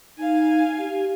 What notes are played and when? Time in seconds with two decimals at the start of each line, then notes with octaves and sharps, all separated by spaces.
0.18 D#4 F5 G#5
0.78 G4